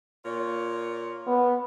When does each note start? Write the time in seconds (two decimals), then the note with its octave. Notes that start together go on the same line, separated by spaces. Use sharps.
0.24 A#2 F4 C#5
1.27 B3